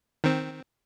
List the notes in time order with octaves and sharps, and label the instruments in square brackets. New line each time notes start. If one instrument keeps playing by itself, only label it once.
[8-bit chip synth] D#3 C4